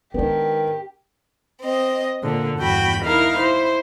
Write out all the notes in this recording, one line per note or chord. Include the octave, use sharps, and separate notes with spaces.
D#3 G#3 B3 D4 D#4 G4
C4 D#5
A#2 D3
E2 G2 F#4 G5 B5
D#4 E4 A#4 F5
E4 C5